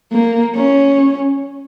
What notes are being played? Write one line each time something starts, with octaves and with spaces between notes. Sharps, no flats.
A#3
C#4